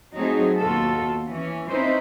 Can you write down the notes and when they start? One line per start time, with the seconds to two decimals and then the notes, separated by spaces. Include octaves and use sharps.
0.14 F#3 A3 C4 D#4 G#4
0.59 D#2 B2 F4 F#4 A4
1.27 E3 C#4
1.68 C4 C#4 D#4 E4 B4 C5